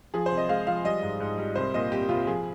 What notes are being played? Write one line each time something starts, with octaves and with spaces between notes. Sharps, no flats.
F3 G#4
C5
C2
D#5
G#3 F5
F3 F5
G3 D#5
G#2
G#2
G3
C2 C5
A#2 D#5
C2 G4
C2 F4
F3 G#4